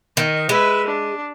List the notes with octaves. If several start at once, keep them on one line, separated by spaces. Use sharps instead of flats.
D#3 D#5
G#3 B4 E5
D4